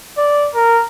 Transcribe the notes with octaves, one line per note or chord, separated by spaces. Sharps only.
D5
A#4